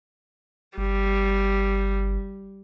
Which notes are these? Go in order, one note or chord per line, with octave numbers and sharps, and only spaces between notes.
G1 G3